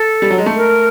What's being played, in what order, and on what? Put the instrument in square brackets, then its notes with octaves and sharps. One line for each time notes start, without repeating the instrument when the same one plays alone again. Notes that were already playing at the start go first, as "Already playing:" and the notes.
Already playing: [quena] A4
[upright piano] G3
F#3
G#3
A3
[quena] A#4